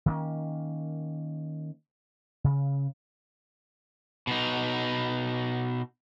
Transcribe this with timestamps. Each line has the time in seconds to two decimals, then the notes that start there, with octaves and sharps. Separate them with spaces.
0.06 D#3 A#3 C#4
2.44 C#3
4.27 B2 D#4